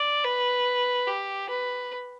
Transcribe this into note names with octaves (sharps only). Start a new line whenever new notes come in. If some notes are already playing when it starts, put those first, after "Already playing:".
Already playing: D5
B4
G4
B4